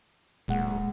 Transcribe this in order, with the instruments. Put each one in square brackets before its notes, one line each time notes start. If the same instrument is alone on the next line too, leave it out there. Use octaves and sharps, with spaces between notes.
[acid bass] D1 [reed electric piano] A#2 G#3 F#5